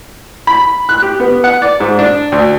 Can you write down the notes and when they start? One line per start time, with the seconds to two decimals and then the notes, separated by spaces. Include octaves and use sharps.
0.47 B5
0.89 F#6
1.02 G4
1.20 B3
1.44 F#5
1.62 D5
1.80 G#2
1.99 D4
2.32 D2